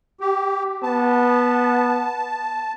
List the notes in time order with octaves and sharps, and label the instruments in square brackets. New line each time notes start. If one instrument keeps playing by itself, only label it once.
[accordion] G4
[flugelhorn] B3 [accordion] A5